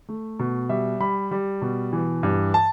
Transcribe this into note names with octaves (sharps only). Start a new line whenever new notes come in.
A3
B2
G3 E5
G3 B5
G3
B2
E3
G2
A5